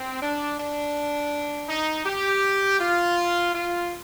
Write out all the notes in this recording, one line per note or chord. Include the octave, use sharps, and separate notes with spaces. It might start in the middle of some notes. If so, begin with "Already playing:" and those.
Already playing: C4
D4
D4
D#4
G4
F4
F4